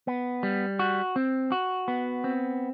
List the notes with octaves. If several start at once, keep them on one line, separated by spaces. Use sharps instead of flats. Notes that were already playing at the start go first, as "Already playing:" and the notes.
B3
G3
F#4
C4
F#4
B3
C4